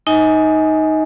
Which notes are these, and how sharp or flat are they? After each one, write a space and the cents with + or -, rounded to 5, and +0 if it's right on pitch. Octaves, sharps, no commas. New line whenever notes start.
D#4 +0 D#5 +35 G#5 +10